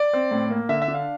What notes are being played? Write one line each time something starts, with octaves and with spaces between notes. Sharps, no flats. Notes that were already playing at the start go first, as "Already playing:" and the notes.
Already playing: D5
C4
A2
A#3
D3 E5
E5
D4
F5